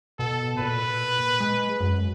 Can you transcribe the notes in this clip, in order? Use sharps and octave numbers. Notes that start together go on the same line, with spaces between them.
B2 A4
A#2 B4
G#3
F#2